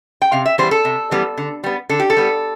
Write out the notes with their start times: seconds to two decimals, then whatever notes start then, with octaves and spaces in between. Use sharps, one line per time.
0.22 G5
0.32 C3 F5
0.46 E5
0.58 E3 G3 B3 C5
0.71 A4
0.85 C3
1.11 E3 G3 B3
1.38 D3
1.64 G3 B3
1.89 D3 A4
2.00 G4
2.10 A4
2.17 G3 B3